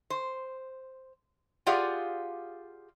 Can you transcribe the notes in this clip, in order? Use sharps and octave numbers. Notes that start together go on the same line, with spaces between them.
C5
F4 G4 G#4 D5 F5 F#5